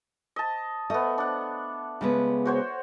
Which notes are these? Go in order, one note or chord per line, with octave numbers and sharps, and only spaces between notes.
D#5 A5
A3 B3 D#5
D4 F#5
C#3 G#3 B3
F#4 C5 C#5